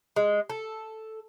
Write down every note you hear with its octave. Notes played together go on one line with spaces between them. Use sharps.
G#3
A4